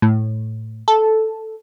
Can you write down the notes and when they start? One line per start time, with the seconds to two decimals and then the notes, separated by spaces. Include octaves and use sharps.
0.02 A2
0.88 A4